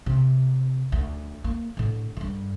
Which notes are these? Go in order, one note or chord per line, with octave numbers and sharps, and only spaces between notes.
C3
D2
A#3
A2 D3
G2 D3